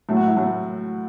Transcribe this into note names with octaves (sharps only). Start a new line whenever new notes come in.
A2 F#3 A3 E4
F#4
E4
A2 F#3 A3